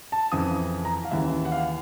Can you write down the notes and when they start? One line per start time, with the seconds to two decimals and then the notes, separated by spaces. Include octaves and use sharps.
0.12 A5
0.32 F2 C#3 E3 D#6
0.85 A#5
1.05 F5
1.11 D#2 C#3 E3 E5
1.45 F#5
1.52 F5